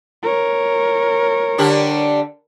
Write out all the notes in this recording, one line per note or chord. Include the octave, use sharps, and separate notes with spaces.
A#4 C#5
D3 G3 D4